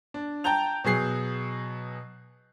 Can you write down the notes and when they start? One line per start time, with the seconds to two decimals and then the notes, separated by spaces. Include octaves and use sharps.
0.14 D4
0.44 G5 A5 A#5 G6 F7
0.84 B2 F#3 G#4 C7